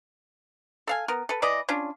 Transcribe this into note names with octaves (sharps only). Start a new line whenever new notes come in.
A4 F5 G#5
B3 A#4
A4 B4
E3 B4 D5 D#5
C#4 D4 F4